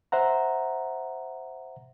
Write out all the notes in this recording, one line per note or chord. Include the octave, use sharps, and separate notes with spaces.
C5 E5 F#5 A#5